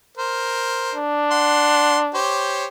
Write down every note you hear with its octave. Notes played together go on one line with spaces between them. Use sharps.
A#4 C5
D4
F#5 C6
G4 C5 C#5